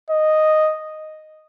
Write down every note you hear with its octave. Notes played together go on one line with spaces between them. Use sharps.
D#5